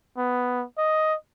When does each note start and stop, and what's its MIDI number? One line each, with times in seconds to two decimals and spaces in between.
0.17 0.64 59
0.77 1.15 75